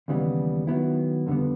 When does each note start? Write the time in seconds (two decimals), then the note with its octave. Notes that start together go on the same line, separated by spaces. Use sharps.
0.08 D#2 C#3 E3 G3 B3
0.67 D#3 F#3 B3 E4
1.27 F2 D3 G3 B3